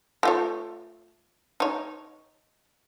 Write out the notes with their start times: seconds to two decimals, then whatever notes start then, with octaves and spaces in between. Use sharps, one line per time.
0.23 A3 F4 C#5
1.60 D#4 C#5